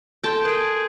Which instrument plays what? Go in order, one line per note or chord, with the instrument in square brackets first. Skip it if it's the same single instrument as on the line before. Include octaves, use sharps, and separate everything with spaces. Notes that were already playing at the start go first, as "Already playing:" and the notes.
[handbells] A4 C6 G6 [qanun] G5 A5
[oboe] G#4 [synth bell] A#4 D7